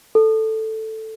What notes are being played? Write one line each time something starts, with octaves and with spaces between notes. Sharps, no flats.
A4